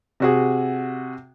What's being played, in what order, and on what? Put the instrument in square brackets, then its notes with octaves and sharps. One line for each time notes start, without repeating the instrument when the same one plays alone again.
[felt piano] C3 F#4 G#4